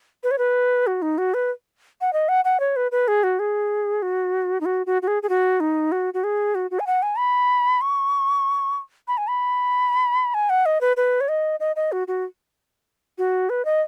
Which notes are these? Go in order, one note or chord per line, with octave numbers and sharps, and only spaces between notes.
B4
C#5
B4
F#4
D#4
F#4
B4
F#5
D#5
F#5
F#5
C#5
B4
B4
G#4
F#4
G#4
F#4
D#4
F#4
F#4
F#4
G#4
G#4
F#4
D#4
F#4
F#4
G#4
F#4
F#4
G#5
F#5
G#5
B5
C#6
B5
G#5
B5
G#5
F#5
D#5
B4
B4
C#5
D#5
D#5
D#5
F#4
F#4
F#4
B4
D#5